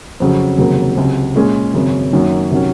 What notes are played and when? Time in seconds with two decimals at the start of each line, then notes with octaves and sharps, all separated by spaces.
0.20 F2 C#3 F#3 C#4
0.58 F1 D#2 C#3 F#3 A#3
0.97 C#2 C3 F#3
1.35 A#2 G#3 C#4 G#4
1.74 G#1 F#2 C#3
2.13 F#2 D#3 F#3 A#3 C#4
2.51 C3 D#3 F#3 C#4